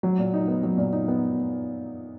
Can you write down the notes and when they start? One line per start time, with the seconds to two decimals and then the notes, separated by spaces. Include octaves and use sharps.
0.03 F#3
0.18 A#2
0.34 D#4
0.48 B3
0.63 F#3
0.78 A#2
0.93 D#4
1.08 B3